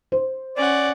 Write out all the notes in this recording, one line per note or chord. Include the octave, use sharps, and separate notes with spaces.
C5
C#4 D5 F#5